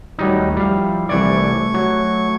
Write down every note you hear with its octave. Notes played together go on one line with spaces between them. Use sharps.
D#2 F#3 G3 A3 D#4
F3 G3 E4 F5
C2 E3 A3 D5 C#6 G#6
F#3